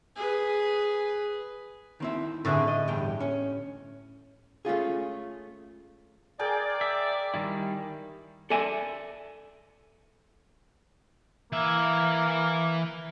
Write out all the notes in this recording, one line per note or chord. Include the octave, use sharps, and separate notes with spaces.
G#4 B4
D#3 C4 E4
A2 D3 C4 D4 G#4
D#5
E2 G2 G5
C#4
A3 C#4 F4 G#4
G#4 A#4 D5 G5
E5
D#3 G3 E4
A4 D5 E5 G#5
E3 A#3 E5